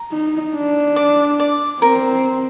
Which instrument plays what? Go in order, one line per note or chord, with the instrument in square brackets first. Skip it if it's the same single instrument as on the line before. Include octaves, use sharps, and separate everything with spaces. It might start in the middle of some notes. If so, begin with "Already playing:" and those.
Already playing: [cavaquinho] A#5
[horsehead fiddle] D#4
D4
[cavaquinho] D5
D5
[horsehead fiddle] C4 [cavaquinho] A#4